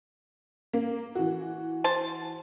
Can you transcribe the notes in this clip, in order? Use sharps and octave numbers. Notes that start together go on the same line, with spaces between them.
A#3
E3 F#4
C5 A5